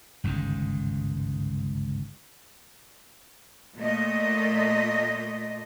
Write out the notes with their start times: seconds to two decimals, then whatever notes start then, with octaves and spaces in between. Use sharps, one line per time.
0.24 G1 C#2 G#2 D#3
3.76 A#2 A3 D#5